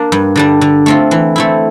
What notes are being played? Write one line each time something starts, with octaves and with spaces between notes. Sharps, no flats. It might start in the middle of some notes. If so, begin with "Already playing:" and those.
Already playing: A#3 D4
G2
D3 G3 D4
D3
A3 C4 F4
E3
A3 C4 E4